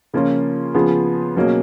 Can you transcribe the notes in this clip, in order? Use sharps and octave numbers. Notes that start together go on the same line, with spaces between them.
C#3 F3 A#3 C#4 F4
C#3 F3 B3 F4 G#4
B2 F#3 A#3 C#4 G#4